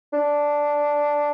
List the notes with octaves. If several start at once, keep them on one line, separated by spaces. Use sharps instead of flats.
D4